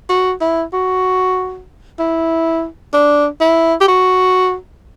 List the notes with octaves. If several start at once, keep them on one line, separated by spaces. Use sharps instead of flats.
F#4
E4
F#4
E4
D4
E4
G4
F#4